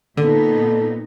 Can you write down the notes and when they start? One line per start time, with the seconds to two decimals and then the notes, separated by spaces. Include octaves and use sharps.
0.17 A#2 D3 B3 D#4 A4